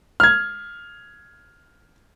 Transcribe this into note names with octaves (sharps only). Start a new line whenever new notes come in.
F6 G#6